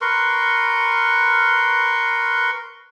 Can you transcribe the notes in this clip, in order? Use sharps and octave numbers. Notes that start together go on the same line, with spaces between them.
A#4 B4 C6 C#6